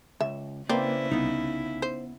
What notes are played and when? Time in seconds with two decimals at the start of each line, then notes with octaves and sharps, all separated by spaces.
0.21 C#2 E5
0.69 C#3 A#3 C4 E4 B4 C5 D5
1.11 C2 B3 D#4
1.82 C5